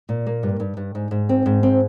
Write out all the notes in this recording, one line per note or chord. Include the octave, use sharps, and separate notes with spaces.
A#2
A#3
G2
G2
G2
G#2
G#2
C4
G#2
C4